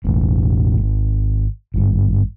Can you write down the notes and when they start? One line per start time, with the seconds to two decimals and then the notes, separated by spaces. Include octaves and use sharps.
0.04 E1 A1 A2
0.82 G#1
1.74 G#1 G2